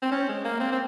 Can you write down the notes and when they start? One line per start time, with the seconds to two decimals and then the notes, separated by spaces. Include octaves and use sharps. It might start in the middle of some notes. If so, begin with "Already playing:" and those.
0.03 C4
0.12 C#4
0.29 G#3
0.44 A#3
0.60 C4
0.72 C4